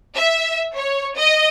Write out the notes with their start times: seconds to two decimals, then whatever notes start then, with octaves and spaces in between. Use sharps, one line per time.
0.15 E5
0.76 C#5
1.16 D#5